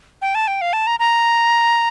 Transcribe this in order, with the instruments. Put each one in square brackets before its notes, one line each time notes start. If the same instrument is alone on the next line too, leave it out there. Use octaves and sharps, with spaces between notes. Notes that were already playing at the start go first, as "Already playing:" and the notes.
[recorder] G5
A5
G5
F5
A5
A#5
A#5